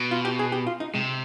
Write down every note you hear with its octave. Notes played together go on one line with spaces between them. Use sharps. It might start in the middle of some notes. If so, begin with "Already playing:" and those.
Already playing: B2
F4
G4
G#4
G4
F4
D#4
C3 G#3